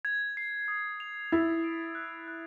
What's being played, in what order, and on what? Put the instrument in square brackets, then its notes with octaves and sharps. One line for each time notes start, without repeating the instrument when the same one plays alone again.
[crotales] G#6
C7
D#6
F7
[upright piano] E4 [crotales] A6
[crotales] D7
F#6
F#6